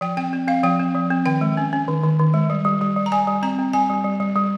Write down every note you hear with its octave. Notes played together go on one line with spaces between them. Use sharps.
F3 G5
C4 G5
C4
C4 F5
F3 G5
C4
F3
C4
D#3 G5
G#3
C#4
C#4
D#3
D#3
D#3
G#3
G3
G3
G3
G3
A#5
G3 G#5
G3
C4 A#5
C4
G3 G#5
G3
G3
G3
G3